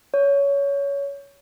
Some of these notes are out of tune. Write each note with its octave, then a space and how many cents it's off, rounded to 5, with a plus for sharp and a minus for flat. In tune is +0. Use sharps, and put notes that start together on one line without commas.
C#5 +20